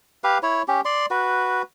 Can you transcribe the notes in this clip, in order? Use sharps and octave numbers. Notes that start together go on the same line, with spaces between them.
G4 B4 F5
E4 C#5
C#4 G4
D5 C6
F#4 B4